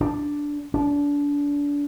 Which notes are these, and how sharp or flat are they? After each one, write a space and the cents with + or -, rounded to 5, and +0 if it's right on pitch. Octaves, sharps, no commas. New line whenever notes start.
D4 -5
D4 -30